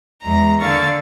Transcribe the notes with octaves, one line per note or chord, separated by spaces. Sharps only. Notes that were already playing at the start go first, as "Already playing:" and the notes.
E2 G#3 A#5
D3 A#3 F5 C#6 A6